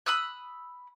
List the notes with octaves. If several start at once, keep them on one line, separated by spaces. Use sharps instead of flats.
B5 D#6 E6 F#6